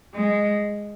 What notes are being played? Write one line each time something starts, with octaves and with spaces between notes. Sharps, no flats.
G#3